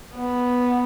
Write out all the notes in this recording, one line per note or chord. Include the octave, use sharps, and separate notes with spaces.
B3